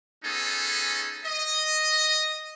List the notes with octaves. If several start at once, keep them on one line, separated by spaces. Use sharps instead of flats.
B3 C#4 D#4 G#4 A4
D#5